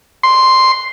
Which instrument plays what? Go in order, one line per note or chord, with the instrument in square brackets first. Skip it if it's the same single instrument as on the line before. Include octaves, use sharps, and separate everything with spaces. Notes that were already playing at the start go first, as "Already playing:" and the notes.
[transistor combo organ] C6